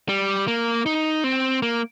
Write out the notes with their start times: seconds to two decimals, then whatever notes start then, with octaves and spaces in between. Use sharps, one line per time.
0.09 G3
0.48 A#3
0.86 D#4
1.24 C4
1.62 A#3